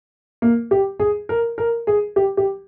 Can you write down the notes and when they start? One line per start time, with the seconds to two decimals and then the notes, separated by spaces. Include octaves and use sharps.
0.42 A#3
0.71 G4
1.00 G#4
1.29 A#4
1.58 A#4
1.87 G#4
2.16 G4
2.37 G4